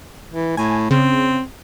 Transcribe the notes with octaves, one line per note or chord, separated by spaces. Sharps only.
E3
A2 G#5
C#3 C4